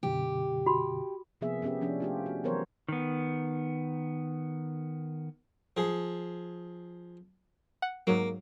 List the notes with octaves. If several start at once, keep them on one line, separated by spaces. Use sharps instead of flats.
F#2 B2 D3 G4
F#4 B5
C3 F3 A#3 B3 G#4 E5
B3 C#4 G4 G#4 E5
F3 C#4 D4
A3 F4 G4
F#4
E3 F#3 B3 A#4 C5 C#5
D#3 B3
F3 G#4
F#5
G#2 F#3 A#3